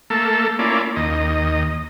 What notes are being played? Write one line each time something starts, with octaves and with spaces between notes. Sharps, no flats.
A3 A#3 A4
A#3 C#4 E4 F4 D5
D#2 D#5